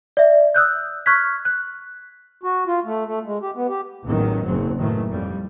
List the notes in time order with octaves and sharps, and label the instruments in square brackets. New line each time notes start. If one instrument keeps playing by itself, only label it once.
[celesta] D5 E5
D#6 E6 F#6 G6
C#6 F6 F#6 G#6 B6
F#6
[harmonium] F#4
F4
A3
A3
G#3
G4
B3
G4
[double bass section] A1 E2 D#3 F#3
F#1 F#3 C4
A2 D#3 E3 F#3 A3
F2 G3